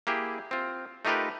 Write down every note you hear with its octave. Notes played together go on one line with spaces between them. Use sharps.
A#3 E4 G4 G#4
C4 F4
A3 D#4 F4 G4 A#4 B4